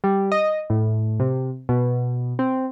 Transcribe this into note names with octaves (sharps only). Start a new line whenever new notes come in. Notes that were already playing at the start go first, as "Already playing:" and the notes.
G3
D#5
A2
C3
B2
C4